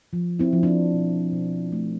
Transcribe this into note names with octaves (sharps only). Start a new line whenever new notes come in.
F3
C4 E4
F3
D4
C4
B2
B2
A3